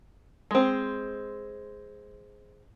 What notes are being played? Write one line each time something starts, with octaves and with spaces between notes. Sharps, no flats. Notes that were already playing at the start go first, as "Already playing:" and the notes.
G#3 C4